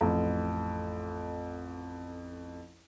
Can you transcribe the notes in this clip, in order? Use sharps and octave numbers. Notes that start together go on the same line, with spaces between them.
A1 F2